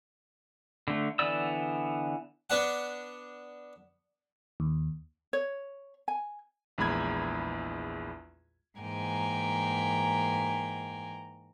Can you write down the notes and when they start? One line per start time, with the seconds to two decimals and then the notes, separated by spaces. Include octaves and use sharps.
0.88 D3 A3
1.19 D3 E3 B3 D5 E6
2.50 B3 D4 F#5
4.60 D#2
5.33 C#5
6.08 G#5
6.78 A#1 E2 G#3 B5 G#6
8.79 G#2 E3 A#3 G5 G#5 A#5